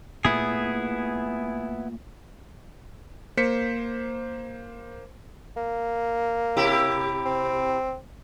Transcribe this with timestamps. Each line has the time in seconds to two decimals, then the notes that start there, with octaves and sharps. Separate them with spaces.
0.25 A#2 A3 B3 E4 G#4
3.37 A#3 C5 B6 C#7
5.56 A#3
6.57 C3 E4 G4
7.25 C4